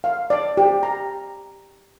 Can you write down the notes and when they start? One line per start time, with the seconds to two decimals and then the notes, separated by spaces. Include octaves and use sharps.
0.04 F5
0.30 D5
0.57 G4
0.83 A#5